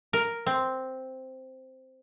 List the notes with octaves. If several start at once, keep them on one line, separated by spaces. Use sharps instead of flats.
A#4
C4